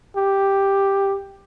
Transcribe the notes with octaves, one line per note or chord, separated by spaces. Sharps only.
G4